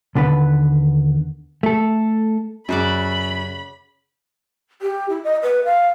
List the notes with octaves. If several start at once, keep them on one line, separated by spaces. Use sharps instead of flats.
D#2 D3 B3 B4
A3 A4
F#2 C#3 F#4 D5 B5
G4
E4
D#5
B4
F5